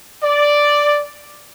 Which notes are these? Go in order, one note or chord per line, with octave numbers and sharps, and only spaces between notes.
D5